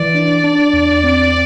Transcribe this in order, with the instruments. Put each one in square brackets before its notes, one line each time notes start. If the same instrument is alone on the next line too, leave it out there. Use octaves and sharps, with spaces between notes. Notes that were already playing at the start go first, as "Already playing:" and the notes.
Already playing: [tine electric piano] E3 [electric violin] D5
[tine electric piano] D4
D4
E2
C4